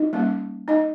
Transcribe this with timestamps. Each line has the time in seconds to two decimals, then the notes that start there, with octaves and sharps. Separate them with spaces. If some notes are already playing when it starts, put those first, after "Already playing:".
Already playing: D#4 D#5
0.13 G3 A#3 C#4
0.68 D#4 D#5